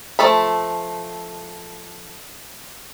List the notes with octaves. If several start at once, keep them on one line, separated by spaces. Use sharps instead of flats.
F3 A3 A4 B5